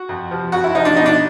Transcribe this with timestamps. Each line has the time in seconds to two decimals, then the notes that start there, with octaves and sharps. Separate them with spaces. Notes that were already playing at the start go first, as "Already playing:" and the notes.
Already playing: F#4
0.09 F2
0.31 C3 F3
0.52 F2 F#4
0.64 E4
0.75 C3 F3 D#4
0.85 D4
0.96 B2 D#4
1.06 D4